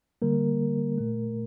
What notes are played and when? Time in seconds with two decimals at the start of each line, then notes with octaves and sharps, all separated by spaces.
0.22 D3 G3 A#3 A#4
0.98 A#2 A3